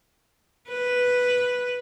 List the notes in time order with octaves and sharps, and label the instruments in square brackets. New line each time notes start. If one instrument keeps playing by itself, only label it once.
[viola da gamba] B4